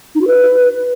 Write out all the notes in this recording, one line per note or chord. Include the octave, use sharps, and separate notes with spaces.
D#4
F#4
B4